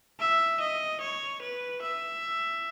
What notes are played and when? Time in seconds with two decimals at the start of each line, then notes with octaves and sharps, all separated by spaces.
0.20 E5
0.60 D#5
1.01 C#5
1.42 B4
1.82 E5